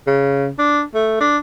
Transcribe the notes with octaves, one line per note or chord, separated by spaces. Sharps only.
C#3
D4
A3
D4